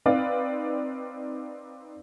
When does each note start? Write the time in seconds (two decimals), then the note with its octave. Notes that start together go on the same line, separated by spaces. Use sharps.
0.06 C4 D#4 B4 D5 F5